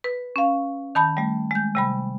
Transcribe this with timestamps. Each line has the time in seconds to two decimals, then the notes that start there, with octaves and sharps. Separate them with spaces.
0.04 B4
0.36 C#4 F5
0.95 D#3 A5 B5 G6
1.17 G3 A3
1.51 G#3 G6
1.75 C3 G3 B5